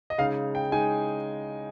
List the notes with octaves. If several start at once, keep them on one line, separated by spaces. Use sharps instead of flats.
D#5
C#3 G#3 D#4 F5
G5
C#3 G#3 D#4 G#5